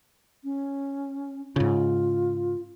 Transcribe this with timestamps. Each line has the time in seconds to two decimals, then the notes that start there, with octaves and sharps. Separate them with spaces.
0.44 C#4
1.56 G#2 C#3 F4